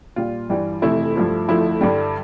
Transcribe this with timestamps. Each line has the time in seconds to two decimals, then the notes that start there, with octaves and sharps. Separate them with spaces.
0.16 A#2 G3 F4
0.50 G2 E3 G3
0.82 F2 C3 E3 A3 E4
1.16 G2 F3 A3
1.49 F2 D3 F3 A3 E4
1.81 G2 D3 G3